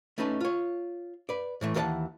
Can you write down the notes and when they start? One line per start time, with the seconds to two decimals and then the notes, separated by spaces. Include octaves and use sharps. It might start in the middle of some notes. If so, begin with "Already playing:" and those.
0.18 A3 C#4 D#4 A4 B4
0.41 F4 C#5
1.29 B4 D5
1.61 A2 E3 A3
1.74 D#2 E3 A4 D5 F#5 A5